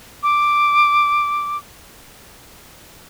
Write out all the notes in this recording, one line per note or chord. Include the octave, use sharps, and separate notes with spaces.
D6